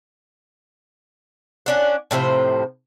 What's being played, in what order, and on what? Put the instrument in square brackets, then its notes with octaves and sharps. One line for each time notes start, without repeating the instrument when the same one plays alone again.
[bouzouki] C#4 D4 F#5
A2 C3 F3 C5